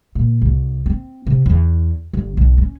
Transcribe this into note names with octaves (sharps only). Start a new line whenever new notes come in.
A#2
C2
C4
C3
E2
G1
B1
C#4